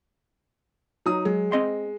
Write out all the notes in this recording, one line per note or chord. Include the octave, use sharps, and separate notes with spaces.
F#3 D#4 D#6
F#3 G#3
C4 D#5 C6